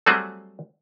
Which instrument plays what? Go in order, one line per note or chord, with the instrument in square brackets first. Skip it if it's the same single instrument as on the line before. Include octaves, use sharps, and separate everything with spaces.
[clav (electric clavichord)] F#3 G3 A3 C4 F#4 G#4